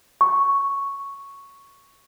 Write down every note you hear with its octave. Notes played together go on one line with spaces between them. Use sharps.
C#6